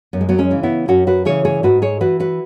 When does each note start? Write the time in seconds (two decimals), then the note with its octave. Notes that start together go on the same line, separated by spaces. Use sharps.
0.13 F#2 B3
0.21 G#3
0.29 F#3 B3
0.38 G#3 C#4
0.51 C#3 E3
0.63 B3 E4
0.88 F#2 C#4 F#4
1.07 F#4 B4
1.25 C#3 E3 G#4 C#5
1.45 G#4 C#5
1.63 G#2 F#4 B4
1.82 G#4 C#5
2.01 E3 F#4 B4
2.20 F#4 B4